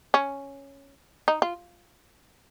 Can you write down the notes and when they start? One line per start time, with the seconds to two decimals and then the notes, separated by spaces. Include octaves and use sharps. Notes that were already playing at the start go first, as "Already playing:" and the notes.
0.14 C#4
1.28 D#4
1.42 F4